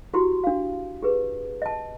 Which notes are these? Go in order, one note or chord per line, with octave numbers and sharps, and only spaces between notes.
E4 F#4 G4 C6
D4 F5
G4 G#4 B4
D#5 A5